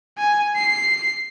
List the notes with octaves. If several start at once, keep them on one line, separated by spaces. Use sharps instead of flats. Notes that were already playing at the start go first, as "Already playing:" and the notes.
G#5
C7